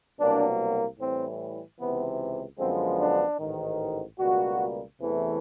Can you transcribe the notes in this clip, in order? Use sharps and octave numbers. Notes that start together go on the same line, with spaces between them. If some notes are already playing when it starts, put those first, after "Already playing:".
C2 B2 F#3 A#3 D4
A2 E3 G3 C4
C#2 C3 E3 B3
F#2 D3 F3 G#3 B3 C4
D4
A1 G#2 D#3
C#2 B2 G3 A#3 F#4
E2 C3 E3 A3